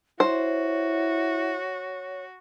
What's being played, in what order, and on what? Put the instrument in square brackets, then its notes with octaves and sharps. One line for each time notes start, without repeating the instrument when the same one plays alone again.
[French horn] E4 [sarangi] F#4 [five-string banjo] C5 [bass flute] C#5